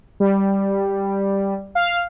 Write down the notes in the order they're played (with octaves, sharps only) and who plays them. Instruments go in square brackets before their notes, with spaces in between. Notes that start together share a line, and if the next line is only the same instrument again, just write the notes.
[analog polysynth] G3
F5